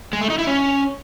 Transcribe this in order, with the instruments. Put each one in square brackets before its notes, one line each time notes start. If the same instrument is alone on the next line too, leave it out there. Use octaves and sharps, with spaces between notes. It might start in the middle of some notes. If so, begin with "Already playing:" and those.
[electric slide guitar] G#3
A3
D#4
E4
C#4